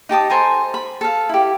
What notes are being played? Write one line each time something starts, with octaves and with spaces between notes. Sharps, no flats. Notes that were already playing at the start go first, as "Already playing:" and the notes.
D#4 G4 A5 D#6
A4 C5 G#5 A#5
B5
A4 F5
E4 G4